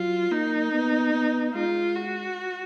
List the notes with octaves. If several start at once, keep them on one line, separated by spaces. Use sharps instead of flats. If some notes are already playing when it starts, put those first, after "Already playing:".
Already playing: F#3 F4
A#3 D#4
B3
B3
G#3 F4
F#4